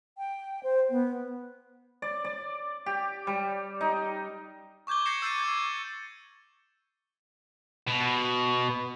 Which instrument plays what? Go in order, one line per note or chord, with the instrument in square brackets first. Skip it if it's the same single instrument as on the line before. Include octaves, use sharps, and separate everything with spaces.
[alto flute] G5
C5
B3
[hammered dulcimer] D5
D5
G4
G3
D#4
[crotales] C#6 D6 G6 G#6 G7
G6 G#6 A#6 C7 C#7 E7
E6 G6 A6 C7 D#7
C#6 G#6
[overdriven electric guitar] B2